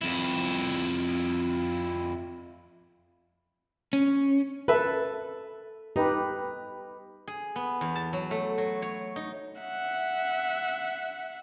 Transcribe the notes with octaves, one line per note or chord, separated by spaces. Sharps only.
F2 E4
C#4
A4 B4 E5
D#4 G4 B4
G#4
B3
E2
A5
F#3
A3
F#3
C#5
D#4
E5 F#5